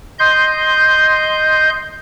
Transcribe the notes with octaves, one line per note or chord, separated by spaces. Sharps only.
D#5 C6 G6